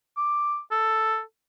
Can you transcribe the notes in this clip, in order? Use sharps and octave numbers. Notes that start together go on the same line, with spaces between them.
D6
A4